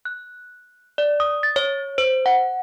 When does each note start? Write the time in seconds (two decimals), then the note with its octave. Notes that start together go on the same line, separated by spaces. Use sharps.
0.05 F#6
0.98 D5
1.20 D#6
1.43 A6
1.56 C#5
1.98 C5
2.26 F#5